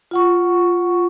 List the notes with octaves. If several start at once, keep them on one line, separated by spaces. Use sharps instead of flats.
F4 F#5 C#6